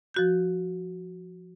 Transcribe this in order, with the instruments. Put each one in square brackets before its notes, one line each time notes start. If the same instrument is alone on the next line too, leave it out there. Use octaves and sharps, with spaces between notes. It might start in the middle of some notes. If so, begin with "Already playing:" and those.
[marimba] F3 F#4 G6